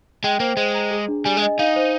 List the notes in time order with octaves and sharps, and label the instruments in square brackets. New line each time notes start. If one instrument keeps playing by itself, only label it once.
[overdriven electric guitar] G#3 [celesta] G5
[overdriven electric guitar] A#3 [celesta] C5
[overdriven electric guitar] G#3 [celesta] C5
[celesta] A#5
G#4
D4
[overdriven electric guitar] G3 [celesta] G#5
[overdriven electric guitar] G#3
[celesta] D#5
[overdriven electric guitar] D#4 [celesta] F5
[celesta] C5